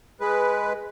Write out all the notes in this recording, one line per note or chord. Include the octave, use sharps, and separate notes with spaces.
G#3 B4